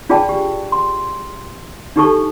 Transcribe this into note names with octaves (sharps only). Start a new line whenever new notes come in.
D4 F4 G#4 D5 G5 A5
G4
C6
D4 D#4 G4 A4 A5 C#6